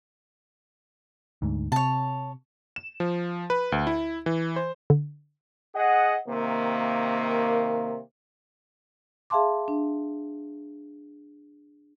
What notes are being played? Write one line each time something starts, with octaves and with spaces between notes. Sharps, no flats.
D2 G#2
C3 C#5 A5
E7
F3
B4
D2
E4
E3
C5
D3
G#4 D#5 F#5
C3 D#3 A#3
G#4 E5 F5 A5 C6 D6
D4